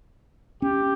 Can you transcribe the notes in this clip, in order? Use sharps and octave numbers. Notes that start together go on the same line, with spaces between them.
C#4 G4